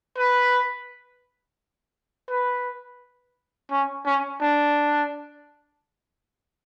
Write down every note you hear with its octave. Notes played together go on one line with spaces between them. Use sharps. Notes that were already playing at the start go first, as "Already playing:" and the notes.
B4
B4
C#4
C#4
D4